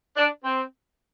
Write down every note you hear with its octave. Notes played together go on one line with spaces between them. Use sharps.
D4
C4